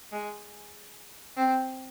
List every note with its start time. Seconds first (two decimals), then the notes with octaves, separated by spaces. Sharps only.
0.12 G#3
1.37 C4